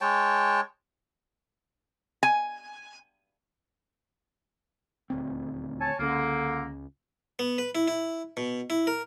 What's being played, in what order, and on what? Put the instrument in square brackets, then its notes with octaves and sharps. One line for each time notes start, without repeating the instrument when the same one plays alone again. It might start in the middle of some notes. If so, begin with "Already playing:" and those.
[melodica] G#3 C#5 G5 A5
[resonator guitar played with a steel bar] G#5
[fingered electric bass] D#1 D2 C4
[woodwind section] C#5 G#5 A5
[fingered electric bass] C#2 C#4 [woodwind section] D3 A#3
[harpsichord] B3
B4
E4
E4
B2
E4
A#4